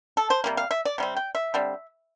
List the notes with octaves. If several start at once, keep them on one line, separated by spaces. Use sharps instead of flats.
A4
C5
C3 G3 A#3
F5
E5
D5
C3 G3 C4
G5
E5
D3 G3 C4